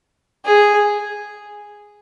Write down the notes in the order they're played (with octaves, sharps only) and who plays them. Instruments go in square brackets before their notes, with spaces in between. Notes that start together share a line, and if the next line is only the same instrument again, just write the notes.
[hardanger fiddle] G#4